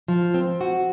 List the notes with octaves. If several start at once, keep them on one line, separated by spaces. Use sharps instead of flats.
F3
C4
F#4